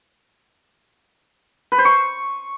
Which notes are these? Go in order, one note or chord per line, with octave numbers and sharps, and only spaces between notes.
B4
C5
C#6